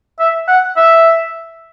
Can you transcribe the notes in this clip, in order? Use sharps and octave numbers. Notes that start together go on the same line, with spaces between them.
E5
F#5
E5